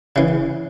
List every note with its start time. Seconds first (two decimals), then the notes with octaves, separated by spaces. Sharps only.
0.16 C#3 E3